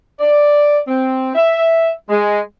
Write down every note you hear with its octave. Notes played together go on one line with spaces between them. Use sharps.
D5
C4
E5
G#3